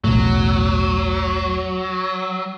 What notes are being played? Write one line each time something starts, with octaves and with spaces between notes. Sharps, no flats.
E1 B1 A2 F#3